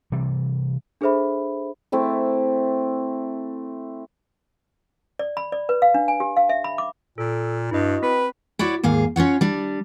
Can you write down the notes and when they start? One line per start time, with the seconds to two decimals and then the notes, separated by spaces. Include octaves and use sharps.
0.12 C3 E3 G3
1.01 D4 G#4 A4 C5 E5 B5
1.92 A3 C4 E4
5.19 D5
5.37 B5
5.52 D5
5.69 B4
5.82 F5
5.95 D4
6.08 G#5
6.20 G4
6.36 F5
6.49 E5
6.64 B5
6.78 D6
7.18 A#2 A4
7.71 G2 E4 F#4 D#5
8.02 C4 B4 B6
8.59 E4 F#4 C#5 D5
8.83 D#2 G#2 G#4 F5
9.16 C#4 F4 C#5 F#5
9.41 G3 D4